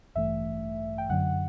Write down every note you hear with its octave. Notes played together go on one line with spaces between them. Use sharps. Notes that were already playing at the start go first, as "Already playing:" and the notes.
A1 G2 E3 A3 E5
G5
F#2 D3 F#3 F#5